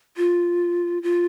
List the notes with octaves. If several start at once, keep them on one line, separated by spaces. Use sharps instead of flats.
F4
F4